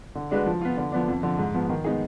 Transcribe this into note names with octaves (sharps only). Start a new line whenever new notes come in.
D3
G#3 D4 F#4 B4
F3
B3 F4
D3
F3 B3 D4
F2
D3 F3
G#2
F3 B3
D#3
G#3 B3 D#4 G#4